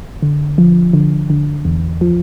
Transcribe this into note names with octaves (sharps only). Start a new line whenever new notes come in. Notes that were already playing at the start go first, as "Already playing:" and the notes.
D3
F3
D3
D3
E2
F3